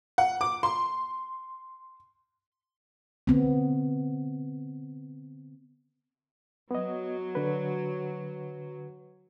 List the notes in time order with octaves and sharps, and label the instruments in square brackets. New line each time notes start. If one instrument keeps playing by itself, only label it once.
[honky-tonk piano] F#5
D6
C6
[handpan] D3 B3 C4
[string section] F#3 [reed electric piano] B3 D#5
[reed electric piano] D3 B4